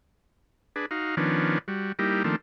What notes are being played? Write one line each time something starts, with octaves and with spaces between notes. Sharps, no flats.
D4 G#4 B4
D#4 F#4 F5
D#3 F3 B3 C#4 D4
G3 F#4
G3 A#3 D#4 E4 G4
D#3 F3 A3 A#3 C4 D4